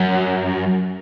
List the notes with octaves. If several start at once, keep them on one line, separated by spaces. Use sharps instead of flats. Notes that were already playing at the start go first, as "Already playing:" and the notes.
Already playing: F#2